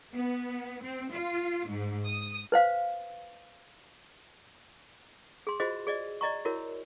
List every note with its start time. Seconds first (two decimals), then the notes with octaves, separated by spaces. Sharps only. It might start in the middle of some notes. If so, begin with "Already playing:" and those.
0.13 B3
0.83 C4
1.13 F4
1.68 G#2
2.06 D#6
2.52 B4 C5 F5
5.47 G#4 C6
5.60 F4 F#4 G#4 C5 D#5
5.87 G#4 D5 D#5
6.21 D5 D#5 A#5 C#6
6.45 E4 F#4 A#4 C#5